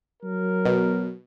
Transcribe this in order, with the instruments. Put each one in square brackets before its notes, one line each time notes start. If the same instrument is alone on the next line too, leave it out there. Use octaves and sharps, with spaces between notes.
[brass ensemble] F#3 A#4
[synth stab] B2